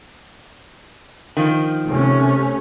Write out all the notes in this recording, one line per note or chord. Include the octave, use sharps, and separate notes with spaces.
D#3 F3
C3 A3 C#4